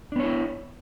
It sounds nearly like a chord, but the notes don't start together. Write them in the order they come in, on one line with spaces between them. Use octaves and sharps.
D4 B3 C#5 E4